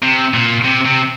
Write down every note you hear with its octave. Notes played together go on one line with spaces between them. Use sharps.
C3
A#2
C3
C3